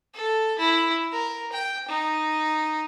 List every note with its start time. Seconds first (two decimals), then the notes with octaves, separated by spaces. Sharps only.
0.14 A4
0.59 E4
1.12 A#4
1.52 G5
1.88 D#4